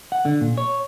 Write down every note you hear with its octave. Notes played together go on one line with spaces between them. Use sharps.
F#5
D3
A#2
C#5